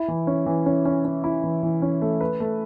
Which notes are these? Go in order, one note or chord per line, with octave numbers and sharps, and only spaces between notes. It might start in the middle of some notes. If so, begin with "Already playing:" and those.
Already playing: E4
E3
C#4
E3
C#4
C#4
C#4
E4
E3
E3
C#4
A3
B4
A3